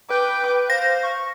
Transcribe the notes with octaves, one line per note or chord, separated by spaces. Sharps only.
B4 G5 D6 G6
C5 F5 A#6
C#6